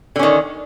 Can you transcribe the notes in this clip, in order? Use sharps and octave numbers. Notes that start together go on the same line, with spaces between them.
D3 D#3 C#4